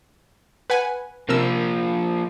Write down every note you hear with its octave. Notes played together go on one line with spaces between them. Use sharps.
B4 F#5 G#5
C3 F3 A#3 A#4 E6